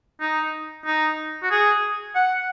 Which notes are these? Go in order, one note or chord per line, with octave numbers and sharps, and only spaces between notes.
D#4
D#4
F#4
G#4
F#5